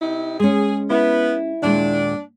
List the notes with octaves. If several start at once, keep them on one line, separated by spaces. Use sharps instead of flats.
C3 D#4 E4
G#3 C#4 G#4
B3 E4
D#2 A#2 G#3 D4